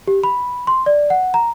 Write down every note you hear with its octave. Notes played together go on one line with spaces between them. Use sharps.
G4
B5
C6
D5
F#5
A#5